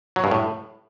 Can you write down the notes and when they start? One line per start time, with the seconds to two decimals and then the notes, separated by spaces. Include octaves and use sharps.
0.16 F#3
0.24 G2
0.31 A2